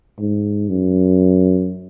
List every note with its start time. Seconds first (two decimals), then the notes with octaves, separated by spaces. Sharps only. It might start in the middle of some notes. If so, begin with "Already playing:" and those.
0.18 G#2
0.69 F#2